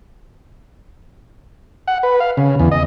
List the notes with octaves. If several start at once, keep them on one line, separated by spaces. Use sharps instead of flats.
F#5
B4
F5
C#3
E2
D#5